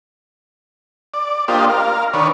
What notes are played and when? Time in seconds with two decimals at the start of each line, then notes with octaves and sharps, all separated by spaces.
1.14 D5
1.48 A#3 D4 F4 G4 C5 D#5
1.69 A#4 F5
2.13 D#3 D4 B4 C#5